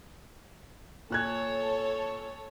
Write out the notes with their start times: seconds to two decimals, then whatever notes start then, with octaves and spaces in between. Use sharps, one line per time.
1.10 A#2 A4 C#5 F#6 G#6